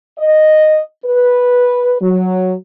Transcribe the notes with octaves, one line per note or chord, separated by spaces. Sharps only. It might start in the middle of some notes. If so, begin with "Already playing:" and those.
D#5
B4
F#3